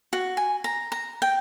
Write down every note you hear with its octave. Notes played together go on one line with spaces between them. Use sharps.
F#4
G#5
A#5
A#5
G5